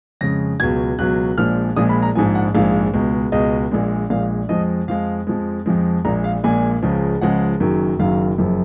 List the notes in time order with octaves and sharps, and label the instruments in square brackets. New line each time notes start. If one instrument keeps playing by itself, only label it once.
[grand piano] F2 C#3 G#3 A#6
C#2 B2 F#3 G#6
C#2 B2 F#3 F#6
A#1 A#2 F3 G#3 F6
A#1 A#2 F3 G#3 D#6
B5
A#5
A#1 G#2 F3 G#3 G#5
F#5
A#1 G#2 F3 G#3 F5
C#2 B2 G#3
C#2 B2 G#3 D#5
A#1 A#2 G#3
A#1 A#2 G#3 F5
F2 F3 G#3 D#5
F2 F3 G#3 F5
F2 F3 G#3
F2 F3 G#3
A#1 A#2 G#3 A#5
F5
A#1 A#2 G#3 G#5
C#2 C#3 F3 G#3
C#2 C#3 F3 G#3 F#5
F#1 F#2 D#3 F#3
F#1 F#2 D#3 F#3 F5
F#1 F#2 F3